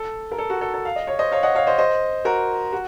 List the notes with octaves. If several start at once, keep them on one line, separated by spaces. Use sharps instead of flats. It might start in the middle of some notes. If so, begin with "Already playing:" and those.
Already playing: A4
A#4
A4
F#4
A4
A4
F5
D#5
C#5
C5 D#5
C#5 F5
D#5 F#5
C#5 F5
C5 D#5
C5 D#5
F#4 A#4
F#4